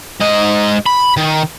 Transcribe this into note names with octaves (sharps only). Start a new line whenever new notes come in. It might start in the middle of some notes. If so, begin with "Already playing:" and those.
G#2 D#5
B5
D#3